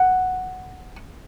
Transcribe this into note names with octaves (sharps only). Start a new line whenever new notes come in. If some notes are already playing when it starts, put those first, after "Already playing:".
Already playing: F#5